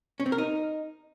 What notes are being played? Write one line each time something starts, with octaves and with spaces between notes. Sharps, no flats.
C#4
C4
A#4
D#4